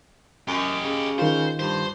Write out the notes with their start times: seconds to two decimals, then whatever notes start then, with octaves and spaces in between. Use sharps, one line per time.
0.48 F#2 G4 D#5
0.83 C#3
1.19 D#3 F4 C5
1.59 G2 C5